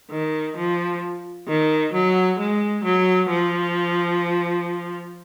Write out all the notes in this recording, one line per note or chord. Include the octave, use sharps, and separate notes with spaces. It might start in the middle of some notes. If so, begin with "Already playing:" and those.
D#3
F3
D#3
F#3
G#3
F#3
F3